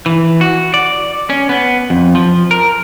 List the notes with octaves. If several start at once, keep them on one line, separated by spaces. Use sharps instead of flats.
E3
F#4
D5
C#4
B3
F2
F3
A#4